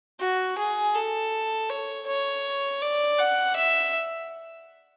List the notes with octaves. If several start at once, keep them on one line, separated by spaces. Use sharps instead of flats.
F#4
G#4
A4
C#5
C#5
D5
F#5
E5